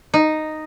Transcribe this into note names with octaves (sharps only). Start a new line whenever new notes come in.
D#4